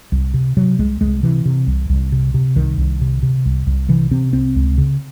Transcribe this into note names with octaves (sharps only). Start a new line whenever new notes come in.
C2
C3
C3 F#3
C2 G#3
C2 G#3
C3 E3
C3
C2
C2
C3
C3
C2 D#3
C2
C3
C3
C2
C2
C3 E3
C3 C4
C2 C4
C#2
C#3